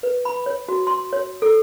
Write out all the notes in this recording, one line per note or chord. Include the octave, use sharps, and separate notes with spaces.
B4
B5
C#5
F#4
C6
C#5
A4